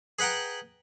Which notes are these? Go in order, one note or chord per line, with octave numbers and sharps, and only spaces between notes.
G#4 B4 F#5 G5 A#5